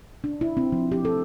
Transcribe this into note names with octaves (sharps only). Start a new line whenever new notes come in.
D4
E4
C4
F3
G4
A4